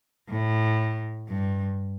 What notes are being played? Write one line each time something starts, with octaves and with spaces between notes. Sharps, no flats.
A2
G2